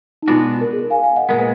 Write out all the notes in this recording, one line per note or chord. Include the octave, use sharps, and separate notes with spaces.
D#4
B2 G#3 B3 D4 F4 F#4
A#4
G#4
A#4
F5 G#5
F5 G#5
D#5 F#5
A#2 G#3 B3 A#4
B4